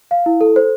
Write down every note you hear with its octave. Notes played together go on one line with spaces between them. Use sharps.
F5
E4
A4
C5